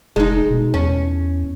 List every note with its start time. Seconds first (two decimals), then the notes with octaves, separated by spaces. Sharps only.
0.16 F1 G#3 D#4
0.51 B2
0.74 E2 C#4